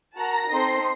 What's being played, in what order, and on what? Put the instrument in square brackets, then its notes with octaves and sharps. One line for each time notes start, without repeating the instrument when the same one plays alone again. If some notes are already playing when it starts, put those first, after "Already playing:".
[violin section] F#4 A#4 F#5 A5 [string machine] A#5
[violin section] C4 D#4 A4 C5 D#5 [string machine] C6